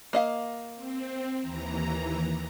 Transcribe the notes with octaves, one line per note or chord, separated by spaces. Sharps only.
A#3 D#5 F5
C4
D#2 E3 A#5